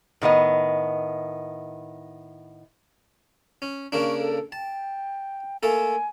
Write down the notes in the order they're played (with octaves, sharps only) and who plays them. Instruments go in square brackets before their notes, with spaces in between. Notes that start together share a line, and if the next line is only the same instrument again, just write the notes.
[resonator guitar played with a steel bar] A2 D#3 B3 D#5
[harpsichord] C#4
[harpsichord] C#3 A#3 D4 [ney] C#6
[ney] A4
[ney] G5 [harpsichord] A5
[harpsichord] A3 A#3 A4 [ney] G#5